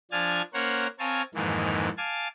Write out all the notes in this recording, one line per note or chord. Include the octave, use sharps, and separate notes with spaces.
F3 D4 G#5 F6 G#6 A6
A#3 C#4 A#4 C5 C#5 F#5
C4 A#4 C#5 F5 G#5 A5
F2 G#2 D#3 E3 A#3
F5 G#5 A5 D6